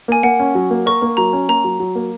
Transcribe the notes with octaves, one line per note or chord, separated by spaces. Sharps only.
A#3 G#5
A#3 F#5
C#4
F#3
A#3
A#4 C#6
A#3
F#3 A#5
C#4
A#3 A#5
F#3
F#3
A#3